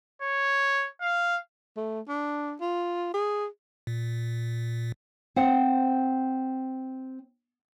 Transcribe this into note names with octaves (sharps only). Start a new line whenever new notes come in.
C#5
F5
A3
D4
F4
G#4
A#2
C4 C5 F#5